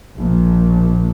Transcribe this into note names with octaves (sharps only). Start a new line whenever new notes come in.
A#1